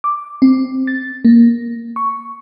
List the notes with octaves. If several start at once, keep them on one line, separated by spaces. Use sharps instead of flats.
D6
C4
A6
A#3
C#6